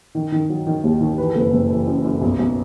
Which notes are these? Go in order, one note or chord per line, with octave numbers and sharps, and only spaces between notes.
D#3
D#3
F#3
D#3
D#2
D#3
E3 B4
A4
F#1 B4
F#1
E3
F#2
F#2
B1
B1